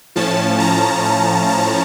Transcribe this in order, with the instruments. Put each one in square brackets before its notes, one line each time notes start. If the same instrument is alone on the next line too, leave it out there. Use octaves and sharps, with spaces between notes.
[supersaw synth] A2 F3 C#4 A5
A#5
A#5
A5